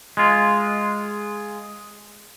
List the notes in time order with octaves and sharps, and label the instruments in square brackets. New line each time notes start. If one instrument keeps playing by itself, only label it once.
[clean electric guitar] G#3 F4